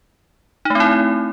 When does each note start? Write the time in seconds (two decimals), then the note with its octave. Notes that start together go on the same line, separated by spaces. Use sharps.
0.65 D#4
0.70 A3
0.75 C4
0.80 E4